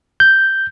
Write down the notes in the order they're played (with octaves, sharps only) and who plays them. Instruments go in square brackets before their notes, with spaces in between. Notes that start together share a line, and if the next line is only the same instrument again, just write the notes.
[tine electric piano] G6